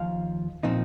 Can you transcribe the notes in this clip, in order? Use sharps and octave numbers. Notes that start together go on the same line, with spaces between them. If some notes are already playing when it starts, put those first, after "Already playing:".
Already playing: D#2 F3 F5
A#2 F3 C4 D#4